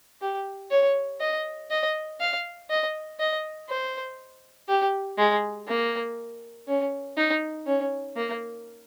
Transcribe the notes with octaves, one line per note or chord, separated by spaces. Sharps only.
G4
C#5
D#5
D#5
F5
D#5
D#5
C5
G4
G#3
A#3
C#4
D#4
C#4
A#3